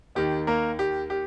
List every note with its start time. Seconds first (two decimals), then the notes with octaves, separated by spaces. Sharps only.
0.15 D#2 D#3 G4
0.47 A#3 A#4
0.79 G4
1.10 G4